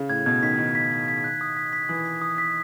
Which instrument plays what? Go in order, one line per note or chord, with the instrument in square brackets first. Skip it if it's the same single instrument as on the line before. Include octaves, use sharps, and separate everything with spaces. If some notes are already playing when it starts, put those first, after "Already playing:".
Already playing: [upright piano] C#3
[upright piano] A2 [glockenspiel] G#6
[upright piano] B2 [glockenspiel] G#6
[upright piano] D#3 [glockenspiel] B6
[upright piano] D#3 [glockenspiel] G#6
[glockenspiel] B6
B6
B6
F#6
D#6
B6
B6
[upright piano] E3 [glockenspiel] D#6
[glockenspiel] B6
D#6
B6